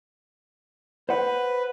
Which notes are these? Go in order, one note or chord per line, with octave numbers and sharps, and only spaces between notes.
B4 C5 F#5